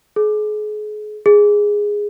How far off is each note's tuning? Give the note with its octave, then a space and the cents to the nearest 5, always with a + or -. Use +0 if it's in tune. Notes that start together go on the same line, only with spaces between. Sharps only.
G#4 +35
G#4 -5